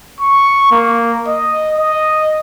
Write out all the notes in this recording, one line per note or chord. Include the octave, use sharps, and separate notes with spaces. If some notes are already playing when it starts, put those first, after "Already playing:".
C#6
A#3
D#5
D#5